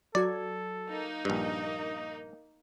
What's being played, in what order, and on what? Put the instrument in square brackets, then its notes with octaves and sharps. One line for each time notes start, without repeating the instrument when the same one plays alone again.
[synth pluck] F#3 F#4 G#6 [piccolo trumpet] A4 [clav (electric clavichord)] D5
[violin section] A#3 D#4
[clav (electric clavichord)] A#1 G2 [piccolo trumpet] D#5